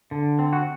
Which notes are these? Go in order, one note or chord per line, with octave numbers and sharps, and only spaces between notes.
D3
C4
F#4